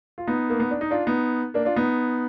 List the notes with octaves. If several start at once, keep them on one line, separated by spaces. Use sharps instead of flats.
F4
B3 D#4
A#3
B3
D4
D#4
D4 F4
B3 D#4
A#3 D4
D4 F4
B3 D#4